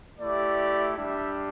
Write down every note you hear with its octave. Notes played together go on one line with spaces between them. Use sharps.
A3 E4 G4 D5
G3 D4 G4 E5